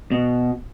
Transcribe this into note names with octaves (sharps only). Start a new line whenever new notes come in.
B2